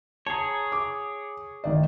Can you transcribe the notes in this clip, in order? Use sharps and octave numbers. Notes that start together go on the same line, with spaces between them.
G#4 C#5 A5 A#5
D6
A1 D#3 D5